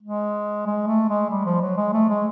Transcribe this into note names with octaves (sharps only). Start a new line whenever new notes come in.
G#3
G#3
A3
G#3
G3
F3
F#3
G#3
A3
G#3